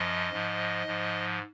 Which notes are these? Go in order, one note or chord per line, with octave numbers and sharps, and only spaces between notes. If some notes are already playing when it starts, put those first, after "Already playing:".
Already playing: F#2 F3 D#5
G#2 F3
G#2 F3